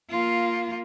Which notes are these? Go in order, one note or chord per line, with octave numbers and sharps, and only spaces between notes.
A#3 F4